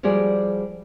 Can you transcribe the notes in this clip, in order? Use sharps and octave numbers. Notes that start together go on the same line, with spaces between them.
F3 G3 F#4 G#4 D5